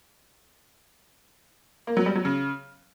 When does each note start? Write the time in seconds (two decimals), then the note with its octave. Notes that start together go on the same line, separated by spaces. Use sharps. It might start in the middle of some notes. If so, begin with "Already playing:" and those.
1.87 A#3
1.97 F#3
2.06 G3
2.15 F#3
2.25 C#3